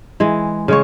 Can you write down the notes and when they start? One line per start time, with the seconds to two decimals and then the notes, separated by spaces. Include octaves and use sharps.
0.20 E3 G#3
0.68 C#3 G#3 C#5